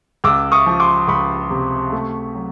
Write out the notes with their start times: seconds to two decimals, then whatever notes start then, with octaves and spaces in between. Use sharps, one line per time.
0.24 C#2 D6 E6
0.52 C#6 D#6
0.66 F3
0.80 C6 D6
1.08 C#2 B5 C#6
1.50 C3
1.92 A3
2.35 F#3